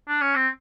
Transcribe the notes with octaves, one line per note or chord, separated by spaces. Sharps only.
D4
C#4
C4